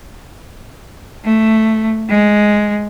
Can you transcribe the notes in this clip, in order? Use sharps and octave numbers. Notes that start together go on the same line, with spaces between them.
A3
G#3